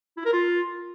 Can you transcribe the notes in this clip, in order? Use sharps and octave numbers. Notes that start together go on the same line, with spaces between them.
E4
A#4
F4